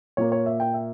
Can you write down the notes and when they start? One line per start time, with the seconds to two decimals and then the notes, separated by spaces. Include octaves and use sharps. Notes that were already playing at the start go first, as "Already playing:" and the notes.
0.17 A#2 A#3 C#5
0.32 C#5
0.46 E5
0.60 G5
0.74 E5